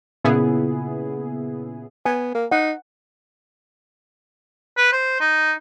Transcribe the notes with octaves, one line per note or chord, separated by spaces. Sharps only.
A#2 C#3 B3 E4 G#4
B3 G#5
A#3
D#4 F#5
B4
C5
D#4